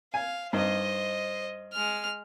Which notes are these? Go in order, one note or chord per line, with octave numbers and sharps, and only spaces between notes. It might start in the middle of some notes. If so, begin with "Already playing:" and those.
F5 G#5
G2 D#4 C5 D#5
G#3 F6